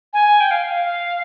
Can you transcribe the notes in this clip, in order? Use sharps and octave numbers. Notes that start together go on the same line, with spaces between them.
G#5
G5
F5
F5